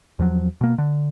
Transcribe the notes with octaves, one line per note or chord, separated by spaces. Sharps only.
E2 F3 F#3
B2 A#3
D3